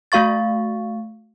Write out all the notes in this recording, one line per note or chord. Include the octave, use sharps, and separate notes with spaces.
A3 F#4 F5 C#6 A6